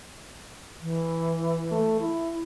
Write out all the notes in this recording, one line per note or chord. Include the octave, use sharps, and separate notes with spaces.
E3
A3
E4